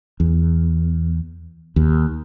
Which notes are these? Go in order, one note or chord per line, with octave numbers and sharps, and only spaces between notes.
E2
D#2